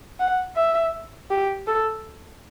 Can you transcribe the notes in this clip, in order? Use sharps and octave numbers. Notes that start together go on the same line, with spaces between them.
F#5
E5
G4
A4